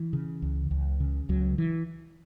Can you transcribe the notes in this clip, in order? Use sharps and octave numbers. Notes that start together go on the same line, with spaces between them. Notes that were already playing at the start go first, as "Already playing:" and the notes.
Already playing: E3
C#3
C#2
C#2
C#3
C#2 F#3
E3